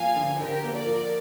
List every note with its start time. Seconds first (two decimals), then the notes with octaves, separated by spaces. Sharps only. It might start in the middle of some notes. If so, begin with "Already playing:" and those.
Already playing: F3 A#3 F5 G#5
0.16 D3
0.39 D3 G4 A#4
0.63 A#3
0.74 A#4 D5
0.86 F3